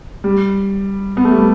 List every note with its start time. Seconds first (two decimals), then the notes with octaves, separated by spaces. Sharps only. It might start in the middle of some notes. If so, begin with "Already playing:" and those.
0.24 G3
1.17 B3
1.24 A3
1.32 G3
1.39 A3